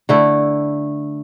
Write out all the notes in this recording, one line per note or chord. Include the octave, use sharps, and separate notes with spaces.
D3 A3 E4